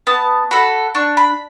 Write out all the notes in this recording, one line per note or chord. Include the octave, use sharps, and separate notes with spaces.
B3 A5
F#4 A4 B5
D4 C#6
B5